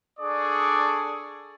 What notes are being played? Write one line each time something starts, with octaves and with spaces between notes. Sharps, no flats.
D4 G#4 A4 D5 C#6 D#6